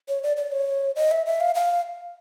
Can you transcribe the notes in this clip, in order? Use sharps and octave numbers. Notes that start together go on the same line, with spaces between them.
C#5
D5
D5
C#5
D#5
E5
E5
F5
F5